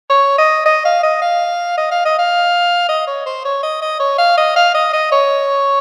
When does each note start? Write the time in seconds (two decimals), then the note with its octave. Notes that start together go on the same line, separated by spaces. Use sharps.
0.09 C#5
0.38 D#5
0.65 D#5
0.85 F5
1.03 D#5
1.22 F5
1.77 D#5
1.91 F5
2.05 D#5
2.19 F5
2.89 D#5
3.07 C#5
3.26 C5
3.45 C#5
3.63 D#5
3.82 D#5
4.00 C#5
4.18 F5
4.37 D#5
4.56 F5
4.74 D#5
4.93 D#5
5.12 C#5